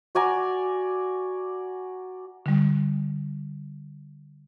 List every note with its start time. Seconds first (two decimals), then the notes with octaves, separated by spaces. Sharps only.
0.15 F#4 D5 G#5 A#5
2.46 D3 G3